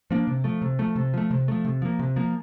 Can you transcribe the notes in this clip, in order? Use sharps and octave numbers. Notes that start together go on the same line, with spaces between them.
F3 A#3 D4
C3
F3 A3
C3
F3 A3
C3
F3 A3
C3
F3 A3
C3
F3 A#3
C3
F3 A#3